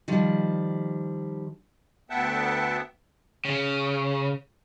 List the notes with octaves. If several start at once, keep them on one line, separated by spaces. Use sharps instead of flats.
D#3 F3 G3
D2 B3 E5 F#5 G5 A5
C#3